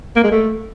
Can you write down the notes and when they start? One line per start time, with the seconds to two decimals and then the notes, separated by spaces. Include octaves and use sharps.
0.16 A#3
0.24 G#3
0.32 A3